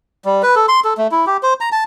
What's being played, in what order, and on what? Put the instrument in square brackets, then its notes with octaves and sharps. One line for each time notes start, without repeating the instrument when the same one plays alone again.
[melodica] G3
B4
A4
C6
A4
A3
E4
G4
C5
A#5
A5